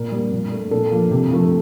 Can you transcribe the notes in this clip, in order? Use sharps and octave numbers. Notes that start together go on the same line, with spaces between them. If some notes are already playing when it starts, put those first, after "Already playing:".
Already playing: A#2 A#4
G3 A#3
A#2
A3
A#2 A4
F3 A#3
C3
F3 A3